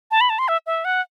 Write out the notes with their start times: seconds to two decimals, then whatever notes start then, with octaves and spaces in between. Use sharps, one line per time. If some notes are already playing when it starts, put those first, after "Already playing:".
0.11 A5
0.21 B5
0.30 A5
0.39 C6
0.48 E5
0.66 E5
0.85 F#5